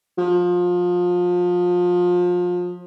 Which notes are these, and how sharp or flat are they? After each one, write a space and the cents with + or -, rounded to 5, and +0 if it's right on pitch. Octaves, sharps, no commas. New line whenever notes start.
F3 +25